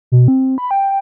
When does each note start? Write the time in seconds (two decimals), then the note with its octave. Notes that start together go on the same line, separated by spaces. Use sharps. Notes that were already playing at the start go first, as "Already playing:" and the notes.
0.12 B2
0.28 C4
0.58 B5
0.71 G5